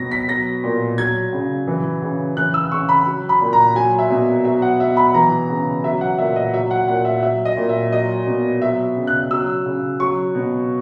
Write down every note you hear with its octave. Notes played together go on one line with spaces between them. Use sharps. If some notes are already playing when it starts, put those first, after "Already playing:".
Already playing: B2 F#3 A#6
B6
F#3 A#6
A#2
F#3 G#6
C#3
E3
C#3
E3 F#6
E6
C#3 C#6
B5
F#3
B5
A#2
A#5
F#3 G#5
E5
B2
F#3 E5
F#5
B2 E5
B5
E3 A#5
C#3
F#3 E5
F#5
A#2 E5
D#5
F#3 E5
F#5
A#2 F#5
E5
F#3 E5
D#5
A#2
E5
F#3 D#5
B2
F#3 E5
C#3
F#6
F#3 E6
C#3
F#3 C#6
B2